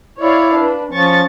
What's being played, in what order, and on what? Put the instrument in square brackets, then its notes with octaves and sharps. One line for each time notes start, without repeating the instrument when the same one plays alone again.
[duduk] E4 [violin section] C#5 D5 F5
[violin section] D4 B4
[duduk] F3 [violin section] C#4 C#6 A6